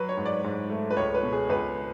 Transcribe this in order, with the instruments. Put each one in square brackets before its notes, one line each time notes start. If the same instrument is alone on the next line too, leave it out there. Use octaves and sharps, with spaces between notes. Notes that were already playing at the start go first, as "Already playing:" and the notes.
Already playing: [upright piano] F#3 B4
C#5
G#2
D5
G#2
A3
B4
C#2 C#5
B4
B2
G#4
C#2 B4